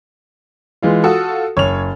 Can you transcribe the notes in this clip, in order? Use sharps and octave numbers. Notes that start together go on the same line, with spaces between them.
E3 G#3 F4
F4 F#4 A4 D#6
F#1 C#5 F7